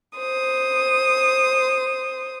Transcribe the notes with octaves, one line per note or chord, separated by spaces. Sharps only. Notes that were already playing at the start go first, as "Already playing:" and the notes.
C5 D#6